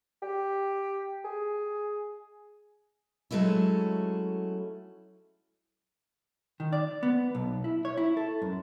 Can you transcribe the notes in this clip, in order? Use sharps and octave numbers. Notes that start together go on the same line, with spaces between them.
G4
G#4
F#3 G#3 A3 C#4 E4
D#3
D5
B3
B1
E4
C#5
E4
A4
F#2